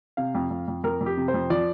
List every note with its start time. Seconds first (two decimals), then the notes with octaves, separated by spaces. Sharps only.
0.17 C3 F5
0.35 F2
0.51 F2
0.68 F2
0.84 F2 A#4
1.01 F2
1.06 G4
1.17 C3
1.28 C5
1.34 F2
1.50 F3 D5